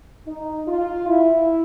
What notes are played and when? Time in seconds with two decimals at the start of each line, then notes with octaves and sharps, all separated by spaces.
0.27 D#4
0.68 F4
1.08 E4